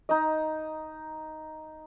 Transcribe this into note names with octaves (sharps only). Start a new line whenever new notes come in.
D#4 D#5